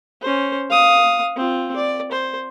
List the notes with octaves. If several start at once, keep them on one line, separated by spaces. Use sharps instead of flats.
C#4 C5
F5 D#6
C4 F4
D5
C5